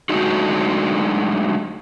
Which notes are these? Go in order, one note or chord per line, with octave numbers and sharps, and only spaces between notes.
F#3 G#3 A3 D4 D#4 F#4